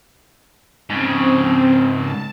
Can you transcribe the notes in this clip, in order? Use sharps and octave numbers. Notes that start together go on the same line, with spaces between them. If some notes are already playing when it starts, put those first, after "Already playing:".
G#2 C#3 C4
A5